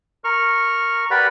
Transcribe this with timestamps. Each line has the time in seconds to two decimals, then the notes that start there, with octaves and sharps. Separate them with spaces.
0.24 A#4 C#6 F6
1.11 G4 A#4 B4 D5 F#5 B5